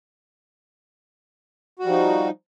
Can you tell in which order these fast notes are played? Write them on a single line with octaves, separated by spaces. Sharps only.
F#4 G3 F3 D#4